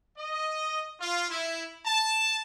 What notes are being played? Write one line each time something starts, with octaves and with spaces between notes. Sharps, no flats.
D#5
F4
E4
A5